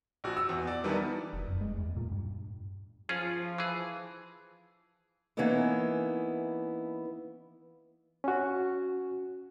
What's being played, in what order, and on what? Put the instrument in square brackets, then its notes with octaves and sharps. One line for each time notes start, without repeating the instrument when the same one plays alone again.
[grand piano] A#1 F#4
E6
E2
D5
D#3 E3 F#3 G3 B3 D4
[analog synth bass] F1
F#2
G#3
E2
A#2
G2
[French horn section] F3 [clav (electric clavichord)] C#4 F4 G#4
[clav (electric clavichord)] E3 G#4
[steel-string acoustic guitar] E3 A#3 B3 C#4 D#4 E4
[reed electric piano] C#4 F#4